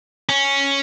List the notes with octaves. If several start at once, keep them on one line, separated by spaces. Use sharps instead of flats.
C#4